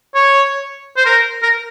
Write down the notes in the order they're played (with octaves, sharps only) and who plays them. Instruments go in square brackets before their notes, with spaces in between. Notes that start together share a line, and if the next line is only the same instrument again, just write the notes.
[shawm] C#5
C5
A#4
A#4